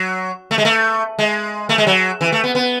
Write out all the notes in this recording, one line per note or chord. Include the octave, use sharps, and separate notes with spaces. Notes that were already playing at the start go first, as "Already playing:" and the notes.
Already playing: F#3
A3
G#3
A3
G#3
A3
G#3
F#3
E3
A3
B3
B3